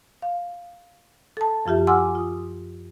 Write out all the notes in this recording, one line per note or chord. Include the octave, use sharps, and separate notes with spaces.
F5
A4 A5
F#2 F3 F4 G4 E5
F#5 G#5 C6 D6 E6 F6
F4 D#6